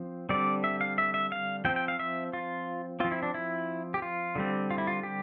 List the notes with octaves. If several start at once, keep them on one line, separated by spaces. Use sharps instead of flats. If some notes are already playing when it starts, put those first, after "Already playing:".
Already playing: F3 C4
D3 G3 C4 D5
E5
F5
E5
E5
F5
F3 C4 G5
G5
F5
E5
F4
F3 C4 F4
E4
D4
E4
G4
F4
D3 G3 C4
F4
E4
F4
G4